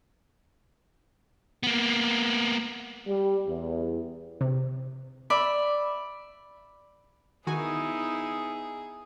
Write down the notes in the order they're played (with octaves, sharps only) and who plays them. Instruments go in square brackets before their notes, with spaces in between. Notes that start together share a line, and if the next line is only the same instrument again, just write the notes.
[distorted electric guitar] A#3 B3
[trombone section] G3
E2
[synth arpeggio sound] C3
[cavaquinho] D5 E5 B5
[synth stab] D#3 F#4 G#5 [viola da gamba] B3 D#4 E4 [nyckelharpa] G#4